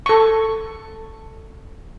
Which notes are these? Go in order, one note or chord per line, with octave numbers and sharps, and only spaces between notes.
A4 C#6